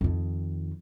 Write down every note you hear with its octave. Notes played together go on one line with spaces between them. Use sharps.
F2 D#3